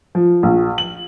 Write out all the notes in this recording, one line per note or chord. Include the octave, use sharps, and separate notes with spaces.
F3
A#1
F#7